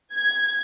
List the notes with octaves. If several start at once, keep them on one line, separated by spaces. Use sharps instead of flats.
G#6